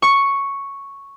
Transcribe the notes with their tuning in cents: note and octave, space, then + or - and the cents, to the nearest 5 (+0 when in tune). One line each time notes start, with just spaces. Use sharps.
C#6 +0